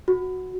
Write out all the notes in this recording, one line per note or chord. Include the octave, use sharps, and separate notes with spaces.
F#4